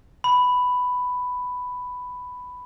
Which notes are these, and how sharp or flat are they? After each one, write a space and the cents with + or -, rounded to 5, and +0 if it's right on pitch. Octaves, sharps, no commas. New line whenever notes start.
B5 +5